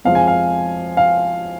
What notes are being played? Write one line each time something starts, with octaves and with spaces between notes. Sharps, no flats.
F2 F3 G#3 F5
G#5
F5
F5